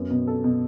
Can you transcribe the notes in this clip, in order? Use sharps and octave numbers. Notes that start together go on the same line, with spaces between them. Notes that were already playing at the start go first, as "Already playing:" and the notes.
Already playing: F#2 B3
B2
A4
B2